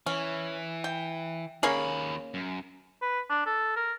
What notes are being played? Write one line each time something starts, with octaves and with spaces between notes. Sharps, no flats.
E3 C#4
G5
D#2 A#3 C#4 G#4 B5
F#2
B4
D4
A4
A#4